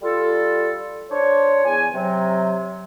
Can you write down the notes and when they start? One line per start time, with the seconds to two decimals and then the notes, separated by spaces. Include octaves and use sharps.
0.02 G3 F4 A4
1.10 D4 C5 C#5
1.65 E2 G#5
1.94 C3 F#3